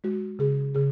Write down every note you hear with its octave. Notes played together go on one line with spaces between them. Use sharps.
G#3 F#4
C#3 G#4
C#3 G#4